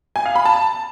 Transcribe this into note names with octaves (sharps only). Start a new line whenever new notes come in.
G#5
F5
B5
A5